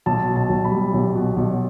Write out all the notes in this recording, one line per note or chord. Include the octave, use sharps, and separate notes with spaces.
B1 A5
B2
A5
B1
B5
G3
B1
B2
B1